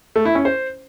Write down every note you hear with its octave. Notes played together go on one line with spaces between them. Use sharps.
A3
E4
C#4
C5